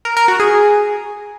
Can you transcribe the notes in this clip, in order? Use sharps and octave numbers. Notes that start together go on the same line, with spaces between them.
A#4
A#4
F#4
G#4